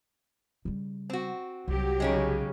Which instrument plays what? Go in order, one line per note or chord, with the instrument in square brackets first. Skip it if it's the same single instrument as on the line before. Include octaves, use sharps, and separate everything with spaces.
[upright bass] C#3 G3
[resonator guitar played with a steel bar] C4 F#4
[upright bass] C2 [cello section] F#3 G4
[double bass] C#3 [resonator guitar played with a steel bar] G#3 C#4 D#4